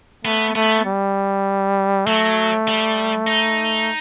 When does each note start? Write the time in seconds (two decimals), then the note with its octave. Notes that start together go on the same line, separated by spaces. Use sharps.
0.25 A3 B3
0.55 A3 B3
0.86 G3
2.06 F#3 A3
2.68 G3
3.27 D#4